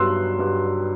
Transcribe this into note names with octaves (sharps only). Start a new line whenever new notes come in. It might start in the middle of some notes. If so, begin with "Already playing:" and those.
Already playing: G2 F#3 B3 C6 E6 F#6
G2